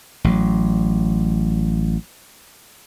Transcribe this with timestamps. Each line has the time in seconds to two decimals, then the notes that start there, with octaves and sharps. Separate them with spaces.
0.24 A1 F#3